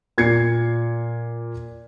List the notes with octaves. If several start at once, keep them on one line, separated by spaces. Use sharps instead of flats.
A#2 G#6 C7 C#7